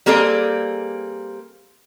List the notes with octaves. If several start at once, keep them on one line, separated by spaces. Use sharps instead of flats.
G3 A#3 C4 G#4 A4 D5